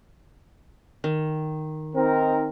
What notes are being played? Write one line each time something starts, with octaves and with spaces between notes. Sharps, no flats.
D#3
C4 D#4 A#4